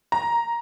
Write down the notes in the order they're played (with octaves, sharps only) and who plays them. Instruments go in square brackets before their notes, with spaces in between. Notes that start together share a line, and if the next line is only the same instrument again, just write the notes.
[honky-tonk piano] A#5